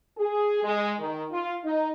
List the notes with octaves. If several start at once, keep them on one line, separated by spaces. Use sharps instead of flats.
G#4
G#3
D#3
F4
D#4